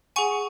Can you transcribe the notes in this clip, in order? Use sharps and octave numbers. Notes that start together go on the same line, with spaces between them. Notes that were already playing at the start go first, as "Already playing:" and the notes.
G#4 F#5 G#5 C#6